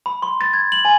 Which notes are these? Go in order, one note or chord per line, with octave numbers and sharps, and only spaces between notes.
B5
C6
A6
G#6
F#7
G#5